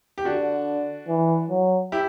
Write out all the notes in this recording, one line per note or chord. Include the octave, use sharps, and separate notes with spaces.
G4
D3 D4 F#4
E3
F#3
E4 G4